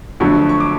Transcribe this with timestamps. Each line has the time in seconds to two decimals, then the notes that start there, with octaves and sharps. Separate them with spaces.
0.20 F2 D3 F#3 A3 C#6
0.49 C#6
0.60 D6